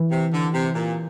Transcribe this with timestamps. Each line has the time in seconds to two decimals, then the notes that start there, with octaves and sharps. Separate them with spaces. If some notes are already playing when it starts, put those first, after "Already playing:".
Already playing: E3
0.11 C3
0.33 D3
0.54 C3
0.75 A#2